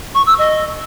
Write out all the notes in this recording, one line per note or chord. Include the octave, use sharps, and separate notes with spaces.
C#6
E6
D#5